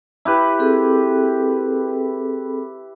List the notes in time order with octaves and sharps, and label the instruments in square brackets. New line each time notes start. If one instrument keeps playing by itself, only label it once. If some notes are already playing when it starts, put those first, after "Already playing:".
[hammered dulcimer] E4 G4 B4
[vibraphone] C4 G#4 A4